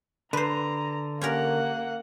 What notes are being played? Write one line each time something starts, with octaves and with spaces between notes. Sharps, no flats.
D3 B4 C5 A#5
A#3 C#4 G4 A#4 F#5